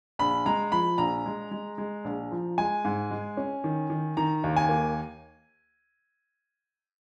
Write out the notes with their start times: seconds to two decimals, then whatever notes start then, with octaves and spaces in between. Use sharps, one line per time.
0.19 A#1 B5
0.46 G#3 A#5
0.72 F3 B5
0.98 A#1 A#5
1.26 G#3
1.51 G#3
1.78 G#3
2.04 A#1
2.31 F3
2.58 G#3 G#5
2.85 G#2
3.11 G#3
3.37 C#4
3.64 D#3
3.90 D#3
4.17 D#3 A#5
4.44 D#2
4.57 G#5
4.69 A#3